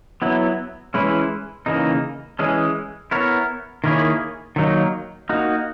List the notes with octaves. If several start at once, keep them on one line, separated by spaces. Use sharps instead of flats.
F#3 B3 E4
E3 G#3 C#4 E4 B4
C#3 E3 A#3 D#4
E3 G#3 C#4 G#4
B3 E4 A#4 C#5
D#3 A#3 E4 G#4 C#5
D#3 F#3 A#3 D#4
A#3 D#4 F#4